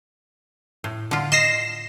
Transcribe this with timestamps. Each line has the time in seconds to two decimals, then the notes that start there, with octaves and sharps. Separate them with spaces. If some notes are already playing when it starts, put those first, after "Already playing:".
0.84 A2
1.11 D3 F4
1.32 D#5 A#6 C7 E7